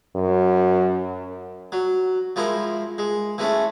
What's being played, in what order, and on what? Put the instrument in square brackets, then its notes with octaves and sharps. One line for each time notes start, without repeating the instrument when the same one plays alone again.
[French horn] F#2
[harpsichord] F#3
F3 G#3 E4 A#4
G#3
E3 G#3 A3 C#4